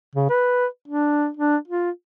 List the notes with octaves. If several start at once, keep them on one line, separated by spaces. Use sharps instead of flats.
C#3
B4
D4
D4
F4